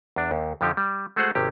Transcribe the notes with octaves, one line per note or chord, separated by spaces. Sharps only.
E2 D4
D#2
F2 D3 F3 D#4 G4
G3
G#3 A3 F#4 G#4 C5 F#5
G#1 C3 C#4 G4